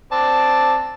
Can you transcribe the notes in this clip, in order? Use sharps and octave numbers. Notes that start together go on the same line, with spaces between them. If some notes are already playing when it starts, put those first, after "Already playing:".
C4 D5 A5